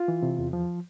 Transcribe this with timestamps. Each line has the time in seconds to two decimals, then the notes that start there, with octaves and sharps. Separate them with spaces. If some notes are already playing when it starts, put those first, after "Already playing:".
Already playing: F4
0.08 E3
0.23 C3
0.39 E2
0.53 F3